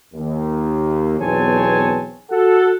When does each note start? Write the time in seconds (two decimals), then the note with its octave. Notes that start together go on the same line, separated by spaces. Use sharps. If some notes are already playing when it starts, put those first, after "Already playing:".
0.14 D#2
1.19 B1 E2 C4 C#5 G#5 A5
2.30 F#4 A4 F#5